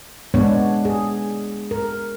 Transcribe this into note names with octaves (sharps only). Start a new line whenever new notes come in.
G#3 B3 D4 C#5
G#4
A#4